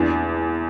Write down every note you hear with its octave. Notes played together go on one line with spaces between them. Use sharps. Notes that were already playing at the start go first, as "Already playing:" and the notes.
Already playing: E2 D4